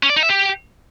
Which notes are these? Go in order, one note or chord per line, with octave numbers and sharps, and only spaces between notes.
C#4
D5
D#4
E5
G4